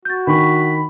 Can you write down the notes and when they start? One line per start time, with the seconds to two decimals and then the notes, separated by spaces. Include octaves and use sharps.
0.05 F#4 G6 A6
0.27 D#3 D4 B5 C#6